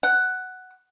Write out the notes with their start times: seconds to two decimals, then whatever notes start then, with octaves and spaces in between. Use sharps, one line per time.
0.03 F#5